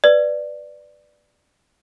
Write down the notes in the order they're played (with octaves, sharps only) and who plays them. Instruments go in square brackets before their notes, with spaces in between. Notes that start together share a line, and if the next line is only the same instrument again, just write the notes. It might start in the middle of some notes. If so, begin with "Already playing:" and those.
[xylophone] B4 D5